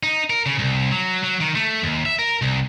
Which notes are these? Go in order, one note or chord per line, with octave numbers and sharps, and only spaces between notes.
D#4
A#4
C#3
C2
F#3
F#3
D#3
A3
D#2
E5
A#4
C2